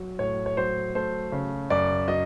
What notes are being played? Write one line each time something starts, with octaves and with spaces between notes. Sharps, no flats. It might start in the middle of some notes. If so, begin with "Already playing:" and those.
Already playing: F#3
A2 C#5
C#5
F#3 C5
A3 C5
C#3
F#2 D5
F#3 D#5